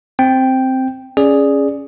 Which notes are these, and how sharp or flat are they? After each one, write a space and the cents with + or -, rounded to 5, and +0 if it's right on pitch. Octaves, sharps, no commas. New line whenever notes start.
C4 +0 G5 +0
C#4 +0 G#4 +0 D5 +0